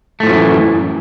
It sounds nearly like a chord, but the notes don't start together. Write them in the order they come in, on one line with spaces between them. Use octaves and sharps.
A3 A2 F3 F#2 E3